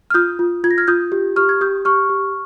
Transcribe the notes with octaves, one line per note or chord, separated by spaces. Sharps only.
F6
F4 D#6 G6
F4
F4 G#6
A#6
F6 G#6
F4 D#6 G6
G4
G4 C#6 F6
G#6
G4 D#6 G6
G4 C#6 F6
G4